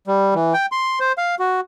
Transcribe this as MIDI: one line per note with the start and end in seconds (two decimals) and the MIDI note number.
0.07 0.34 55
0.35 0.54 52
0.54 0.66 79
0.72 0.99 84
1.00 1.12 72
1.18 1.35 77
1.39 1.60 66